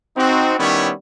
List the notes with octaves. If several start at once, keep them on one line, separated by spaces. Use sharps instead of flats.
C4 D#4 F#4
D#3 G3 B3 C#4 E4 C#5